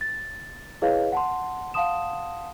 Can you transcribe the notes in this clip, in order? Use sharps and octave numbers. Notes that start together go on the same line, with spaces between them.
A6
E4 G#4 B4 C#5 D#5 F5
F#5 A5 C6
F5 F#5 A5 C6 D#6 E7